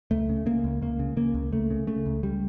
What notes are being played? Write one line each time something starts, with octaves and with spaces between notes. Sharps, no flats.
C#2 A3
C#3
C#3 A#3
C#2
C#2 A#3
C#3
C#3 A#3
C#2
C#2 A3
C#3
C#3 A3
C#2
C#2 G3